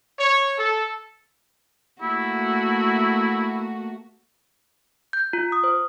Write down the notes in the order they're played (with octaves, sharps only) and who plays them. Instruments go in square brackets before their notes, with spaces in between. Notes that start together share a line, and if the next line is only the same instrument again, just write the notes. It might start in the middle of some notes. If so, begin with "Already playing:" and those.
[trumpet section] C#5
A4
[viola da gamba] A3 A#3 F#4 [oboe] E4
[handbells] G6
F4
D#6
C5